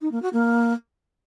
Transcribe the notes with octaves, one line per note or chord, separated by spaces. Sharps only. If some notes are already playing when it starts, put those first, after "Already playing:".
D#4
A#3
F#4
A#3